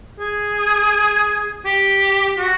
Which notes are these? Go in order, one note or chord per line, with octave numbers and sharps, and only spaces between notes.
G#4
G4
F#4